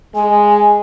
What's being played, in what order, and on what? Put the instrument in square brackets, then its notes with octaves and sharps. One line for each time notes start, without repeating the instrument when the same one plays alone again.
[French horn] G#3 [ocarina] G#5